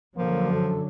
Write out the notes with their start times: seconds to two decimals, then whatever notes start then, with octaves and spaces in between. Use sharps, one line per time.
0.17 F#2 D3 F3 F#3 A#3
0.53 A4